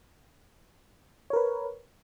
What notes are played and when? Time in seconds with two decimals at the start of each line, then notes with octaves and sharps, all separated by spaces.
1.30 C#5
1.33 A#4
1.36 B4